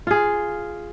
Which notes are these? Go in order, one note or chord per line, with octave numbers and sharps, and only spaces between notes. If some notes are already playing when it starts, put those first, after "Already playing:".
F4 G#4